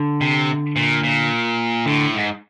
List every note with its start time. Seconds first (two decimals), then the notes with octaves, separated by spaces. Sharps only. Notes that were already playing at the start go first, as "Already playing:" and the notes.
Already playing: D3
0.21 C3
0.76 A#2
1.03 A#2
1.86 A2 D3
2.14 G#2